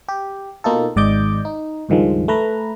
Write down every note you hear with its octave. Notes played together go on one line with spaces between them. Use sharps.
G4
B2 A#3 D#4 F4 A4
G#1 G#2 D5 D#5 D6 G6
D#4
C#2 G2 D#3 F3 G#3
A3 B4 A#5